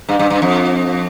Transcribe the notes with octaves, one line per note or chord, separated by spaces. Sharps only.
G2
G2
G2
F2